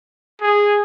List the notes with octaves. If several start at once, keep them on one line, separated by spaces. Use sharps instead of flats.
G#4